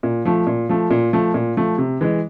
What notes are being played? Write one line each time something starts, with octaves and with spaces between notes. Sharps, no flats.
A#2
F3 A3
A#2
F3 A3
A#2
F3 A3
A#2
F3 A3
C3
E3 G#3